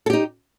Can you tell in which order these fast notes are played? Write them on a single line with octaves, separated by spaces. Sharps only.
A4 G4 D#4